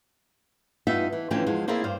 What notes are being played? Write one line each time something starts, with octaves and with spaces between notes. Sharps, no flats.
G2 B3 D#4 F4 E5
E3
D3 E3 F3 A3 C#4 G5
E2 F3 G#3
A#3 C4 E4 G#4 A#4 D5
G2 C5 F5